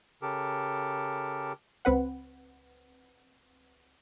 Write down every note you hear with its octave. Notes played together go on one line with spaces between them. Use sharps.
C#3 G4 A4 A#4
C#2 C4 B4 F#5